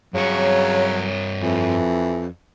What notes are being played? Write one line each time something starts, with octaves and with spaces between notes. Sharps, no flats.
G2 C#3 F#3 C#5
F2 E3